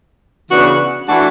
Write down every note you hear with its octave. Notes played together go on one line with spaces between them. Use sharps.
C#3 E3 B3 D4 F#4
E3 A3 D4 F#4